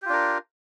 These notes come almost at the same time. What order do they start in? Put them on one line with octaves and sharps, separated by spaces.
G4 F4 D4 A#4